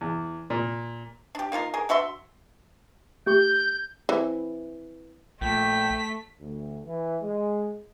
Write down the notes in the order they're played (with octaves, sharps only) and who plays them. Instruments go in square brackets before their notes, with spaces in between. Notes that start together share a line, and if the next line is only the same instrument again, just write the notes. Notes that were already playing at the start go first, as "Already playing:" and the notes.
[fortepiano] E2
A#2
[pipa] D4 G4
A#3 D#4 F4 A#4
G#4 A#4
D4 F#4 E5 C6
[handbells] A3 G4 C#6 [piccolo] G6
[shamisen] E3 C4 E4
[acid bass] A#1 [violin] A3 B6 [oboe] G5
[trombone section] D2
E3
G#3